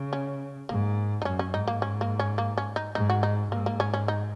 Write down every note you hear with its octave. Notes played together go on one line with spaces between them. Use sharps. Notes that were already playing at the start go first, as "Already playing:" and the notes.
Already playing: C#3
C#4
G#2 A#3
D#4
F#2 C#4
C#4
G#2 D#4
A#3
C#4
A#3
C#4
A#3
C#4
D#4
G#2 D#4
F#4
D#4
G#2 A#3
A#3
C#4
C#4
D#4